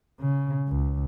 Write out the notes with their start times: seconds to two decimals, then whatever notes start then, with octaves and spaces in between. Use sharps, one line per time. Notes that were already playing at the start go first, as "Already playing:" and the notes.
0.20 C#3
0.69 C#2